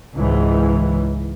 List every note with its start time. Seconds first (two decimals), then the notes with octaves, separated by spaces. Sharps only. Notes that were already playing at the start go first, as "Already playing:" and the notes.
0.15 C#2 G#2 E3